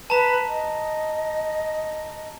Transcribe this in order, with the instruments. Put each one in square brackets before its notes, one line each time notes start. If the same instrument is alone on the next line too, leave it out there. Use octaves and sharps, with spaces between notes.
[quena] B4 [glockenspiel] A5 A#5
[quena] D#5